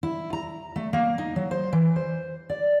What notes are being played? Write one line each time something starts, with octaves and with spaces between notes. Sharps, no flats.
E4
A#5
A3
A#3
D#4
F#3
C5
E3
C5
D5